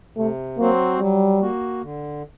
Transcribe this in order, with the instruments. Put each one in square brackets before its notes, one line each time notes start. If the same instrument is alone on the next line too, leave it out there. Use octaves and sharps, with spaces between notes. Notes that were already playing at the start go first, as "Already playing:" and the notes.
[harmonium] C3 [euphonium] A3
[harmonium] F#3 C4 F#4 C5 [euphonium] A#3
[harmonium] F#3 [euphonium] G3
[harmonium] A#3 F#4
D3